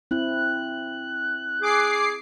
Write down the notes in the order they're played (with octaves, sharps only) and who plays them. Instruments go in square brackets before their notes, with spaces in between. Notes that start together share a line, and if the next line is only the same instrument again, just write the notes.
[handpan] C4 E4 [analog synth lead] F#6
[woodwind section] G#4 [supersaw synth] D6 C7